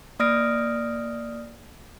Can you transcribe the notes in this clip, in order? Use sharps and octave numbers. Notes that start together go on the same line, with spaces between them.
A#3 D5 D#6 F6 A#6 D7